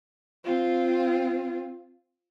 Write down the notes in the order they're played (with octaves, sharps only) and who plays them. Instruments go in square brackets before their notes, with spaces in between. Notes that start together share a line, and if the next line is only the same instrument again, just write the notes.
[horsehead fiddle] C4 F4